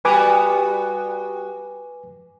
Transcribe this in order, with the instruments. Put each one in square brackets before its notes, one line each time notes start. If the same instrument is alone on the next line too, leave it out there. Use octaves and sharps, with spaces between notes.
[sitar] G3 B3 F#4 [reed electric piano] B4 G#5 D6